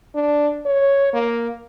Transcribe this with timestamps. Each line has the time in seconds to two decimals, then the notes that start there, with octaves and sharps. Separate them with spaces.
0.15 D4
0.66 C#5
1.14 A#3